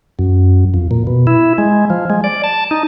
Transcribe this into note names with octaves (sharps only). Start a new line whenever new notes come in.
F#2
F2
A#2
B2
E4
G#3
F3
G#3
D5
A5
D#4